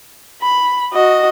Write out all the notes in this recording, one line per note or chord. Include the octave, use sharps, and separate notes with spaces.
B5
F#4 D#5